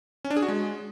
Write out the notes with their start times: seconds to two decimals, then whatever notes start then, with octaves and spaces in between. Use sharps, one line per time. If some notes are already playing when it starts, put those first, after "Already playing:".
0.25 C#4
0.30 D4
0.36 G#4
0.42 F#4
0.48 G#3